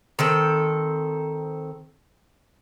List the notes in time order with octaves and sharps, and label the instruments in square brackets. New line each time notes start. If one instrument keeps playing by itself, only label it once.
[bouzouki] D#3 C4 A4